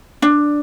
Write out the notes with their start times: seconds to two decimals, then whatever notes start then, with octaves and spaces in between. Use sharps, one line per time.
0.22 D4